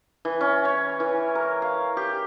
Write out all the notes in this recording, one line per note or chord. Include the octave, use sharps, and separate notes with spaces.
E3
C#4
C#5
E3
A#4
F5
G4